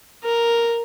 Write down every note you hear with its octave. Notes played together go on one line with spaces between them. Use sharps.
A#4